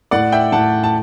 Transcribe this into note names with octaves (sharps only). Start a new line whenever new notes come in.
A2 D5 F#5
E5 G5
A2 F#5 A5
A5